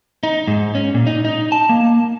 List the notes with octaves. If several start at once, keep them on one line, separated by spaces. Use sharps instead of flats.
D#4
G#2
C#4
A#2
D#4
D#4
A5
A#3